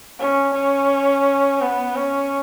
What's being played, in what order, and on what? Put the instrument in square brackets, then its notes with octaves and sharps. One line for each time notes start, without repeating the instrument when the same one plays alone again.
[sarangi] C#4
C#4
B3
C#4